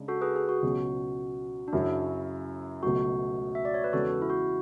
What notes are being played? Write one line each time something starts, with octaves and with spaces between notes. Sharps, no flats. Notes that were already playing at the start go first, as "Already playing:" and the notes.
Already playing: C#3 G#3 D4
F#4 A4
G#4 B4
G#4
F#4
C#2 B2 F#3 C#4
D4
F#2 C#3 F#3 E4
C#2 B2 F#3 A3 F#4
E5
D5
C#5
B4
E2 C#3 G#3 F#4 A4
E4
F#4